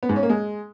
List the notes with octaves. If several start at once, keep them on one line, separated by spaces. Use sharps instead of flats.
B3
G#2
C#4
A#3
G#3